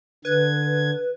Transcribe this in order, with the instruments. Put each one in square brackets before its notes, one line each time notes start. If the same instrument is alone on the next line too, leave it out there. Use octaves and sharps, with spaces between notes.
[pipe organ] D3 G#6 [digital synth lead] B4